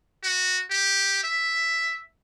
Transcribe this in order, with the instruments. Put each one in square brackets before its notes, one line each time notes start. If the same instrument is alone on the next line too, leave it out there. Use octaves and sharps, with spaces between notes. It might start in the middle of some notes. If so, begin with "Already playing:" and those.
[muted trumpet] F#4
G4
E5